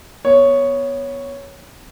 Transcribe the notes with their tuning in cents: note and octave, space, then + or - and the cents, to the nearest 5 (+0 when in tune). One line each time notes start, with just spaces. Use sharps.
B3 -5 C#5 +0